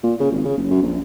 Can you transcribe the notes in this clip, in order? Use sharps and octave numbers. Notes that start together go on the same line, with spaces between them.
A#2
C#3
G#1
C#3
F#1
F#2
A#1